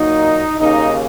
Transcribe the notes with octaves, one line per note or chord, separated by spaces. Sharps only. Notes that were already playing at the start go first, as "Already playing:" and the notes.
Already playing: A#2 F#3 A#3 D#4
D#2 C#3 A#3 D#4